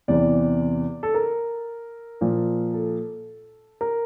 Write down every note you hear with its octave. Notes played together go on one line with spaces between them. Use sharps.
E2 C3 E3 D5
A4
A#4
A#2 F3
A4
A#4